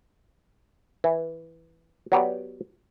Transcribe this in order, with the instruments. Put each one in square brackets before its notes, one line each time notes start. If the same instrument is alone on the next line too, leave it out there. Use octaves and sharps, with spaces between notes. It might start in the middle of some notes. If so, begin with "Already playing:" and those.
[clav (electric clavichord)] E3
F#3 B3 G4 D5